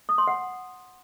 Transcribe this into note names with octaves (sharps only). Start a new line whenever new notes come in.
D#6
C6
F#5